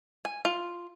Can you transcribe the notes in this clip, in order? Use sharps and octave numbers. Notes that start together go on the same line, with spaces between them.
G#5
F4